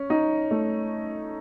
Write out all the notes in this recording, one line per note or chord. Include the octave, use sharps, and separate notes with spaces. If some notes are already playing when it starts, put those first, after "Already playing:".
Already playing: C#4
D#4
A3